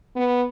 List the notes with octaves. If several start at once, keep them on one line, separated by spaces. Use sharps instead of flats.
B3